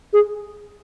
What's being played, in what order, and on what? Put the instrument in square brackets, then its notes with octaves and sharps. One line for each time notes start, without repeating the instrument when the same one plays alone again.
[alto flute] G#4